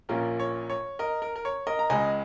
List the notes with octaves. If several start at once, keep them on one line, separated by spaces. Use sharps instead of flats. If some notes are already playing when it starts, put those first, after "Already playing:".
A#1 A#2 A#3 C#4 F4 A#4
C#5
C#5
A#4 D#5
A#4
A#4
C#5
A#4 D#5
A#5
C#2 C#3 G#3 D#5 G#5